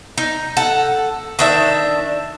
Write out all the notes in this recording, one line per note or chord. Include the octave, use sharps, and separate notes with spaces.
D#4
A4 F#5
D#3 D4 E5